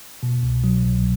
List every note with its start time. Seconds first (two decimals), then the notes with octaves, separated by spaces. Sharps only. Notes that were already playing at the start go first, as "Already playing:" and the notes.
0.23 B2
0.43 C2
0.64 F#3
0.85 C2